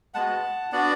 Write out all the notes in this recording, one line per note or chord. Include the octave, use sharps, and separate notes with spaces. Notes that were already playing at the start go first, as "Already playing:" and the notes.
G#3 B3 F#4 F#5 A5
B3 D4 F#4 D5 F#5